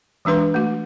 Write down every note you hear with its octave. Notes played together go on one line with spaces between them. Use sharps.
E3 G#3 D4 B4 C6
A3 F#4